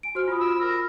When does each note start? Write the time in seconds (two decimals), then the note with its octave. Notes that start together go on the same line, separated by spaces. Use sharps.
0.03 G#5 D7
0.15 F#4 C5 F6
0.28 F4 B5 D#6
0.40 E6
0.60 A#4